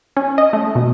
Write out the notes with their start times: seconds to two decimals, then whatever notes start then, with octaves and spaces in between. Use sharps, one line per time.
0.17 C#4
0.38 D#5
0.53 A3
0.75 B2